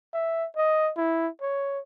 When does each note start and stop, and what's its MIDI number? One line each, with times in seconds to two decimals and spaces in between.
0.13 0.46 76
0.56 0.92 75
0.97 1.28 64
1.41 1.80 73